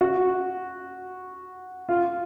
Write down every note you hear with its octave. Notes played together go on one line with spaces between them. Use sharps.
F#4
F4